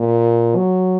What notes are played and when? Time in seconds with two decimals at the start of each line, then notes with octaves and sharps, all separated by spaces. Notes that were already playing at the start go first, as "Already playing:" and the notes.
Already playing: A#2
0.56 F#3